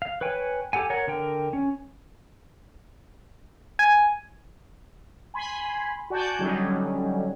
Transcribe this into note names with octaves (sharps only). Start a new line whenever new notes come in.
F5
B4 C#5 G5 G#5
G4 A4 F#5 G#5
A#4 C#5 F#5
D3 A#4 G5
C#4
G#5
G#5 B5 C6
F#4 D5 G#5 A5 G6
D3 F#3 G3 C#4 D#4